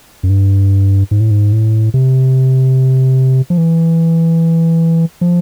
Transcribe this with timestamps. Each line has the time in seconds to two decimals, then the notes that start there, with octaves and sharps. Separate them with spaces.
0.23 F#2
0.30 G2
1.11 G#2
1.20 A2
1.31 G#2
1.52 A2
1.94 C3
3.50 F3
3.58 E3
5.21 F3